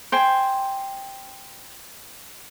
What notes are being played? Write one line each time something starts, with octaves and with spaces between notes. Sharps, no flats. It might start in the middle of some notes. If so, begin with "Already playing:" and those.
C5 G5 G#5